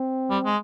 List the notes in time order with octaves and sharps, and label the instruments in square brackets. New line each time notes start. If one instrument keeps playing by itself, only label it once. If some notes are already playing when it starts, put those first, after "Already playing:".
Already playing: [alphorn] C4
[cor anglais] G3
G#3